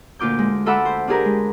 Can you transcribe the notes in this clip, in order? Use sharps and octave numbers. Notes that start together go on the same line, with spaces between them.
D2 A#2 F4 D6 G6
G#3
F4 A4 E5 F#5 B5 D6
C5
D4 F4 G4 G#4 A#4 B4
G#3